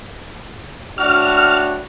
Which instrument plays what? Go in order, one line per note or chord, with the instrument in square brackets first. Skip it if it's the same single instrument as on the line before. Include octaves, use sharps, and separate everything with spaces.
[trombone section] A2 D4 F#4 [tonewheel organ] F6